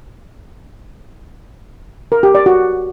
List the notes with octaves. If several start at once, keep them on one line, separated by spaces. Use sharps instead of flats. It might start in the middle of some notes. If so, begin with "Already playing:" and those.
A#4
G4
D5
F#4